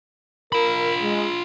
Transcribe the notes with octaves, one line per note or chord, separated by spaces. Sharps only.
F4 A#4 B5
G#3